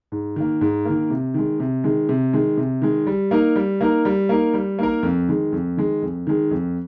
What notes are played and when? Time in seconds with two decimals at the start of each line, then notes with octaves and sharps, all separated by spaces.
0.12 G#2
0.36 D#3 A#3
0.61 G#2
0.85 D#3 A#3
1.10 C3
1.34 D#3 G#3
1.60 C3
1.84 D#3 G#3
2.09 C3
2.33 D#3 G#3
2.57 C3
2.82 D#3 G#3
3.07 G3
3.31 A#3 D#4 A#4
3.56 G3
3.81 A#3 D#4 A#4
4.05 G3
4.29 A#3 D#4 A#4
4.54 G3
4.79 A#3 D#4 A#4
5.03 F2
5.28 D#3 G#3
5.52 F2
5.77 D#3 G#3
6.02 F2
6.27 D#3 G#3
6.51 F2